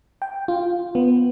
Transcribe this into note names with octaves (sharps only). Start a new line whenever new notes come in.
G5
F4
B3